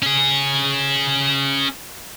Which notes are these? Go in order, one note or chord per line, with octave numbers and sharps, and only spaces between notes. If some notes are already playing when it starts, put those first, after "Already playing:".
C#4 G#4